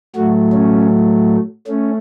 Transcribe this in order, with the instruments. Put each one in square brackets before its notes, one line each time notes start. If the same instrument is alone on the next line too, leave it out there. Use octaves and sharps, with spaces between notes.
[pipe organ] A2 F#3 A3 F#4
C#4
A3 C#4